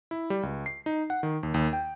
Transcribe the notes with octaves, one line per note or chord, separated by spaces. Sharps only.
E4
G3
C#2
C7
D#4
F#5
D#3
D#2
D#2
G5